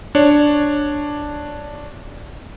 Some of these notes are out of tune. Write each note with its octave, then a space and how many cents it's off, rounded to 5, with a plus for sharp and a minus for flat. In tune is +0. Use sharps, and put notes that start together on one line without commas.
D4 +0 C#5 +0